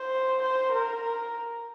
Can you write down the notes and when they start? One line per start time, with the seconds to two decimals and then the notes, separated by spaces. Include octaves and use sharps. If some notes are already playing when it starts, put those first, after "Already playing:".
Already playing: C5
0.43 C5
0.72 A#4